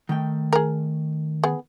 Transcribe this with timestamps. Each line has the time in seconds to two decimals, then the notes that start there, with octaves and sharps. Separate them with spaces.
0.09 D#3 A3 G5
0.53 G#4 A#4
1.44 B3 G#4